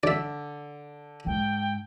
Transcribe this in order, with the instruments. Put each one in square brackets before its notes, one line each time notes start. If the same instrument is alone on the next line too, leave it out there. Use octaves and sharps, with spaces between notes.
[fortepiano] D3 [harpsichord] D5 E5
[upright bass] G#2 [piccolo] G5